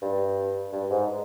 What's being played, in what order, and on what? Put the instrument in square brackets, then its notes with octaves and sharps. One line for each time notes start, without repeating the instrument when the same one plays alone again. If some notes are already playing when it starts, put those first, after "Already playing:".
[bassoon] G2
G2
G#2